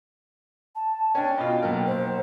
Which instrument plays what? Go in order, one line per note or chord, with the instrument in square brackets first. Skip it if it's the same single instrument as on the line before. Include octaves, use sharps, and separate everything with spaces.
[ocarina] A5
[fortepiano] C#4 D4 [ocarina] G5
[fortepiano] B2 F4
B1 A#3 A#4
[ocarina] C5